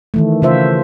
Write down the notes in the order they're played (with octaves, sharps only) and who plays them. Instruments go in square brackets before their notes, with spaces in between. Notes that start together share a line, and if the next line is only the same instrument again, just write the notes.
[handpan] D#3 E3 A3
C#3 E3 F4 C5 E5